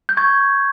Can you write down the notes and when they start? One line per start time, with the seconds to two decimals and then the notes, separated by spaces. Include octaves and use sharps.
0.09 G6
0.17 C#6 G#6